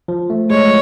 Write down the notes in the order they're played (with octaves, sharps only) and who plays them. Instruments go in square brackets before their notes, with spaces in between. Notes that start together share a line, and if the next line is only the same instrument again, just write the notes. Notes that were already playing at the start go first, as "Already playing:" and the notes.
[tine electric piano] F3
A3
[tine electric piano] G#3 [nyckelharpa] C#5